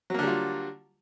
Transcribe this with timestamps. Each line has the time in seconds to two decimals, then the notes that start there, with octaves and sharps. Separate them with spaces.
0.10 F#3
0.14 A#3
0.19 D3
0.23 G3
0.27 F4